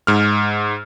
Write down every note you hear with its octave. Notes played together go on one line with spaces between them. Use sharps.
G#2 F6